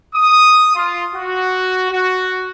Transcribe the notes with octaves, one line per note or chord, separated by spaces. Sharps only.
D#6
F4
F#4
F#4